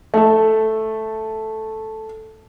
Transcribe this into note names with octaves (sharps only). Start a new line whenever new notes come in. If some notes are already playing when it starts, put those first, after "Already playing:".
A3 A4